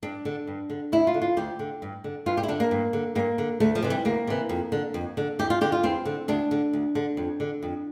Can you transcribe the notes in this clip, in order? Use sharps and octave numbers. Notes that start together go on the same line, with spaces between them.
G2 D4
D3
G2
D3
D2 E4
F4
D3
F4
D2 G4
D3
G2
D3
G2 F4
G4
E4
D3 D4
A#3
G2
D3
G2 A#3
D3
D2 A3
F3
C3 E3
G3
D2 A#3
C3 E3
F2
D3
F2
D3
E2 G4
F4
D3 G4
F4
E2 C4
D3
D2 D4
D3
D2
D3
F2
D3
F2